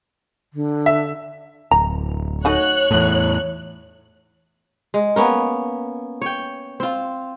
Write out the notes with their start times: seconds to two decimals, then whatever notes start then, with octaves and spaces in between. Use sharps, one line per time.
0.53 D3
0.86 E5
1.71 D1 A#5
2.45 A3 D#4 F#4 C#5 F#6
2.91 E2 A2
4.94 G#3
5.16 A#3 B3 C#4 A#4
6.22 C#5 G5
6.80 C4 F4